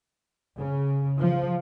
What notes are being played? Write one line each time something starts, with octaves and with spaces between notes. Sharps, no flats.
C#3
F3